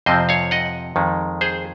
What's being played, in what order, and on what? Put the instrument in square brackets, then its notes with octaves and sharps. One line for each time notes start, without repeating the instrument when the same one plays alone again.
[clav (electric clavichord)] F2 C3 F3 C4 C5 D#5
C#5 F5
D#5 F#5
F2 D#3 G#3
G#4 C5